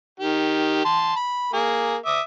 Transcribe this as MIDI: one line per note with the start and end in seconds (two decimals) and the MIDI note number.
0.20 0.83 51
0.20 0.83 67
0.85 1.14 81
0.85 1.14 84
1.16 1.50 83
1.53 1.96 58
1.53 1.96 68
2.06 2.21 76
2.06 2.21 86
2.06 2.21 87